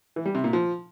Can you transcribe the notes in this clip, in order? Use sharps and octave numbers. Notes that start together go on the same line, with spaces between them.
E3
G3
C3
A#2
F3